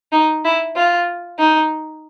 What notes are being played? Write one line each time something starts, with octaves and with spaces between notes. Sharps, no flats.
D#4
E4
F4
D#4